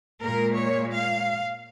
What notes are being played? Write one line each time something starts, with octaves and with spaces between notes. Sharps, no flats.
A#2 G#3 A#4
C#5
F5